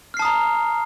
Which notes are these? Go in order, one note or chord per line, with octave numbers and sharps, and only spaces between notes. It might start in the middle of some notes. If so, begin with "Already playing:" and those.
A5 A#5 D#6 F6 C7